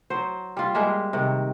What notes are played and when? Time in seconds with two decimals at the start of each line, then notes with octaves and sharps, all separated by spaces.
0.10 F#3 C5
0.57 G3 F4
0.74 G3 G#3 A#3 E5
1.13 C3 D#3